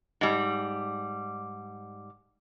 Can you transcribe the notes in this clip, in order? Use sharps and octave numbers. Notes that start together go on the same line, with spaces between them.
G#2 G3